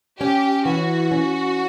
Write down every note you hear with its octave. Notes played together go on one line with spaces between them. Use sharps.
C#4 G4
E3 F#4
C#4